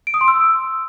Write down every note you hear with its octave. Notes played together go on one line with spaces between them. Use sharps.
D7
D#6
C6
E6